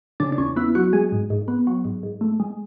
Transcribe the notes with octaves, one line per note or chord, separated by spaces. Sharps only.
C#3 D4
D4
E2 C#4
B3 E4
F#3 F#4
G#3 G#4
G#2
G#2
B3
F#3
G#2
G#2
A3
G#3